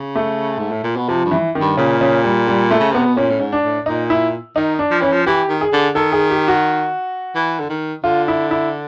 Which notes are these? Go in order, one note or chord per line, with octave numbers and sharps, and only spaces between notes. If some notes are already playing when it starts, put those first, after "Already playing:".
Already playing: C#3
A3
G#2
A2
A#2
B2
C3 F3
G2
E3
D#3
G2
A#2 C#3
C#3
G3
G3
A3
C#3
C3 B3
B2
A#2 C#4
A2
G#2
D4
A2
A#2 D#4
E4
D#3 D#4
D4
F3
E3 C#4
F3
E3 G4
D#3
G#4
D3
D#3 A4
G#4
G4
F#4
E3
D3
D#3
D3 F4
E4
E4